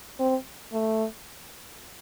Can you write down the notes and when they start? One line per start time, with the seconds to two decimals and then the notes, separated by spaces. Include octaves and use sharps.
0.19 C4
0.73 A3